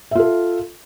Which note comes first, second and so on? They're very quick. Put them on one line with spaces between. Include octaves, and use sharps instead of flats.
E5 F4 A4